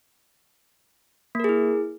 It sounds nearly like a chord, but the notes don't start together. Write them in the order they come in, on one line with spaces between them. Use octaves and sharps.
A#3 A#4 G#4 E4